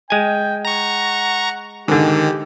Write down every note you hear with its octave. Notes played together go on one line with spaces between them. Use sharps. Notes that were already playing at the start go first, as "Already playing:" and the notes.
G#3 G5 G#5
F#5 A#5 C#6
G#2 D3 D#3 G4